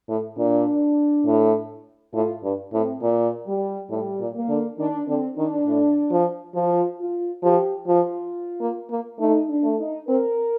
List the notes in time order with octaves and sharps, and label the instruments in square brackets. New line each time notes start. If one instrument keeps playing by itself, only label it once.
[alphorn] A2
[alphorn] A#2 [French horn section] D4
[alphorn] A2
[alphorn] A2 [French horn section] F4
[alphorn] G2
[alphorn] A2 [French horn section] C4
[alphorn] A#2
[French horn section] G3
[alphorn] A2 [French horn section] G3
[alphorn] A#2
[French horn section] A#3
[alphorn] D3
[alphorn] D#3 [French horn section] D4
[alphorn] D3 [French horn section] C4
[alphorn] D#3 [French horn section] D4
[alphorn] A2
F3
[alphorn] F3 [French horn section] F4
[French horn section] F4
[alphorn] F3 [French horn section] G4
[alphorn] F3 [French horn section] F4
[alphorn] A#3
A#3
[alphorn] A3 [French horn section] D#4
[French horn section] D4
[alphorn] A3
[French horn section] D#4
[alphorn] C4 [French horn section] A#4